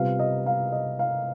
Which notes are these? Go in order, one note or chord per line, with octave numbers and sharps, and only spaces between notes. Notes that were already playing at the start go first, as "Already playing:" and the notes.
Already playing: C3 G3 B3 F4 F5
D#5
F5
D#5
F5